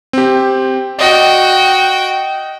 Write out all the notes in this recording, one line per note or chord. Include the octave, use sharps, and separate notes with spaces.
C4 G4
F#4 D5 D#5 G5